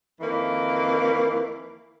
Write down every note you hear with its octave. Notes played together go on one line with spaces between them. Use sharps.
F2 D#3 E3 A#3